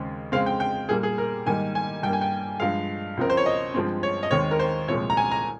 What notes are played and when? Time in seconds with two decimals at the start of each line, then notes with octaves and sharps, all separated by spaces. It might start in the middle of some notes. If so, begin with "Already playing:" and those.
Already playing: D#2 C#3 G#3 C4
0.32 F2 C#3 G#3 C4 F5
0.46 G5
0.60 G5
0.89 A#2 G3 A#3 G#4
1.03 G#4
1.18 A#4
1.46 G#2 D#3 G3 A#3 G#5
1.75 G#5
2.03 G2 G3 A#3 G5
2.13 G#5
2.21 G5
2.60 G2 F3 G#3 F5
3.17 C#2 C#3 F3 C4 A#4
3.30 C5
3.37 C#5
3.46 D#5
3.74 G2 F3 G#3 C4
4.03 C#5
4.23 D#5
4.31 D#2 D#3 G#3 C4 C#5
4.51 A#4
4.59 C5
4.88 C2 A#2 F3 G#3 C#5
5.10 A#5
5.17 G#5
5.31 A#5